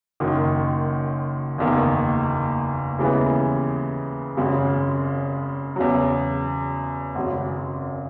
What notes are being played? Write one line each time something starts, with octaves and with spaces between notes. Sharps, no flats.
F#1 F#2 D#3
F#1 E2 D#3 A#3
D#2 C#3 E3 G#3 B3
G#1 F#2 C#3
E2 C#3 F#3
G#1 F#2 C#3